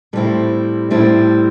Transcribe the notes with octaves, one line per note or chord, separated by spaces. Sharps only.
A2 G3 C4 E4
A2 G3 C4 E4